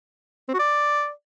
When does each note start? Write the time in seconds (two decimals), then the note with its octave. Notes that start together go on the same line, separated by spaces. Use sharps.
0.49 C4
0.54 F#4
0.59 D5